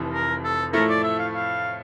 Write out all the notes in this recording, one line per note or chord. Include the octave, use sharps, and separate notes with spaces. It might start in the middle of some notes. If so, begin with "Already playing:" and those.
Already playing: F1 F2 C3 E3
A#4
A4
A2 F3 A3 E4 A4 A#4
D5
E5
F5
F5